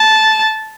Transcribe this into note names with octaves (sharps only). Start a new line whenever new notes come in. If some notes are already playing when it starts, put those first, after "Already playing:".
Already playing: A5